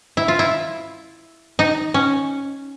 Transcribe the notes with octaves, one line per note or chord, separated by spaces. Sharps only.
E4
F4
E4
D#4
C#4